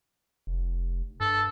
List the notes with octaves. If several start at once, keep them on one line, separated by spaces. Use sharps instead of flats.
F1
G2 A4